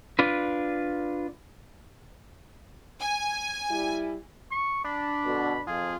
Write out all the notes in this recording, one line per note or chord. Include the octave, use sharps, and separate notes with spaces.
D4 F4 B4
G#5
G3 E4
C#6
D4 B5
B2 D3
F2 F4 G#4